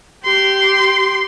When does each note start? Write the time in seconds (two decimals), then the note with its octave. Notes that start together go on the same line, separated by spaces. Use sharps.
0.24 G4 C6